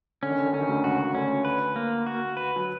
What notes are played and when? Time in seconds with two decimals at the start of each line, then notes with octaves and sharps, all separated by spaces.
0.22 D3 C#4
0.31 D#3
0.38 D3
0.45 D#3
0.53 D3 C#4
0.61 D#3
0.68 D2 D3
0.84 C#2 C#3 F#4
1.14 D2 D3 C#4
1.45 B4
1.76 A#3
2.06 F#4
2.37 B4
2.56 F#3